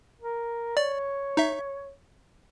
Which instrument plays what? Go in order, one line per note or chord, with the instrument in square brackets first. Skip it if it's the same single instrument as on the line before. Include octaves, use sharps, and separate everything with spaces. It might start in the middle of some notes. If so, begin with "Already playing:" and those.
[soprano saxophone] A#4
[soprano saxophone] C#5 [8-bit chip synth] D5
[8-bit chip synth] D#4 E5